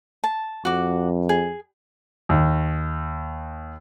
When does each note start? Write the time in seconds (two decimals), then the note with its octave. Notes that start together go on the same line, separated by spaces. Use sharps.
0.24 A5
0.65 F2 F#4 D6
1.29 G#4
2.29 D#2